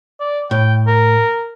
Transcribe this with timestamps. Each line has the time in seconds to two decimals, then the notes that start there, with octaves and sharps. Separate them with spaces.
0.20 D5
0.51 A2 G5
0.87 A#4